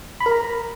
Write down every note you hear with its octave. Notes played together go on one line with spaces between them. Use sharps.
B5
A#4
A#5